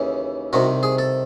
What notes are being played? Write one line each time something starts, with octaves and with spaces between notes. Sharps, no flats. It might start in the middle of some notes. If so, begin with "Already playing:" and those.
Already playing: D#2 C#3 E3
C2 C3 D#3 F#4
G#4
A4